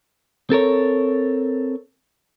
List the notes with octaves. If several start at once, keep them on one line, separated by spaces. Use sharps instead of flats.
C4 A4 A#4 C#5